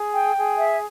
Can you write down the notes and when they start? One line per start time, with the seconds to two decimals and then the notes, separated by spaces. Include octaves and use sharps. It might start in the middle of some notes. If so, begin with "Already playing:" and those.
Already playing: G#4
0.13 G5
0.36 G#4
0.58 E5